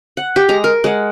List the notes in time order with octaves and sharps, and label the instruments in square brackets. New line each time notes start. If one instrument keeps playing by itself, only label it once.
[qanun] F#5
G4
G#3 A#5
A#4
G#3 F#5